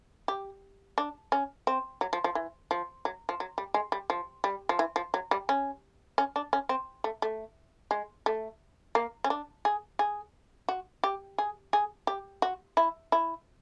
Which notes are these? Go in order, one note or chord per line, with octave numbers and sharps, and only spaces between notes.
G4
D4
C#4
C4
F#3
F3
F3
E3
F3
F#3
F3
F#3
G3
G#3
G3
F3
G3
F3
E3
F3
F#3
G3
C#4
C#4
D4
C#4
C4
A3
A3
G#3
A3
A#3
C#4
D4
G#4
G#4
F#4
G4
G#4
G#4
G4
F#4
E4
E4